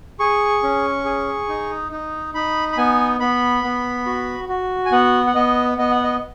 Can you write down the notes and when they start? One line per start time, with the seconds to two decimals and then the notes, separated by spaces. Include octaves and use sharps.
0.20 G#4 C#6
0.63 C#4
1.05 G#4
1.49 D#4
1.92 D#4
2.34 D#4 B5
2.72 B5
2.77 B3 G#5
3.20 B3 B5
3.64 B3
4.06 F#4
4.49 F#4
4.85 G#5
4.92 B3 F#5
5.27 F#5
5.35 B3 D#5
5.78 B3 D#5
5.91 F#5
6.04 D#5